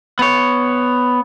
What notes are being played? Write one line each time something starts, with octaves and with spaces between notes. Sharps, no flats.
B3 C#5